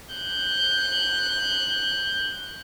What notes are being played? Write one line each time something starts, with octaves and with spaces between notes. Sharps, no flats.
F#6 G6